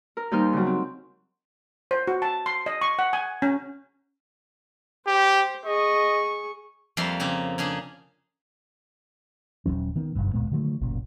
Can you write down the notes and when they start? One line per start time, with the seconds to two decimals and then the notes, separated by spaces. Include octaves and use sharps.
0.17 A#4
0.31 D#2 G3 D#4 C5 F6
0.53 C#3 F#3
0.66 C4
1.91 C5
2.07 F#4
2.22 A5
2.46 C6
2.66 D#5
2.81 C#6
2.99 F#5
3.13 G#5
3.42 C#4
5.07 G4 C5
5.65 G#4 D#5 C#6
6.97 F2 G3 A#3 E5 F5 C6
7.20 C#3 A#3 C4
7.58 C#3 A#3 D4 G#4
9.66 D#1 F#2 F#3 C#4
9.96 D#3 B3
10.16 F#1 B1 G2
10.34 D1 A#2 G#3 B3
10.51 D3 D#3 F#3 A3
10.81 F#1 B1 F#2 A#2